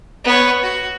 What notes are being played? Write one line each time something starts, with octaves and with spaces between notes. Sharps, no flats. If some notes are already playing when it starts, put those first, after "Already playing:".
B3 C#5
F#4